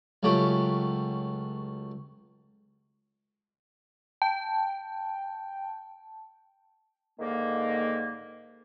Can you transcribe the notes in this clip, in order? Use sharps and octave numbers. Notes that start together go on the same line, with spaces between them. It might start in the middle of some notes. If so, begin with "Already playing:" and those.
C#2 F#3 A3 C#4 G4
G5 A5
G#2 D3 D#3 A#3